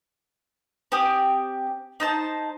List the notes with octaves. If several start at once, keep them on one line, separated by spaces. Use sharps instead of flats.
C4 G4 G#5 D#6
D#4 C5 A5